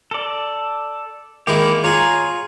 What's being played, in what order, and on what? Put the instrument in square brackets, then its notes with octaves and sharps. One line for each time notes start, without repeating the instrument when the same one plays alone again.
[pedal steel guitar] A4 D5
[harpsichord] D#3 G#3 E4 [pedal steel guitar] A#3 G4
[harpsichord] F4 G#4 [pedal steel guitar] C#5 A#5